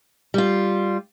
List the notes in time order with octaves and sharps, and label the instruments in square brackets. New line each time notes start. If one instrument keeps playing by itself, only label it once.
[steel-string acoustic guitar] G3 F4